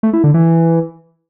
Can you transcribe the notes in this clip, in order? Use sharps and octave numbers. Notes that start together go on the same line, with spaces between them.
A3
E4
D3
E3